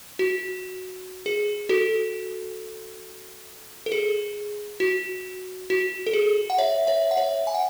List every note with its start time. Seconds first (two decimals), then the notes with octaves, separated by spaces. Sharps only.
0.19 F#4
1.26 G#4
1.69 F#4 A4
3.86 A4
3.92 G#4
4.80 F#4
5.70 F#4
6.07 A4
6.13 G#4
6.50 F#5
6.58 C#5 E5
6.87 C#5 E5
7.11 F#5
7.17 C#5 E5
7.47 G#5
7.54 F#5